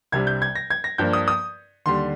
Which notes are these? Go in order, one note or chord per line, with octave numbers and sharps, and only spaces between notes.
C2 C3 G3 D4 G#6
G6
G#6
A#6
G#6
A#6
G2 F3 A#3 D4 G6
D#6
D#6
D#2 D3 G3 C6